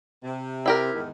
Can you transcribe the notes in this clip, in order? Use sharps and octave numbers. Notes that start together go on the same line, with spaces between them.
C3
E4 G4 A#4
E2 G#2 D#3